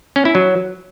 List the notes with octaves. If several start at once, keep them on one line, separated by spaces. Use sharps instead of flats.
C#4
E4
F#3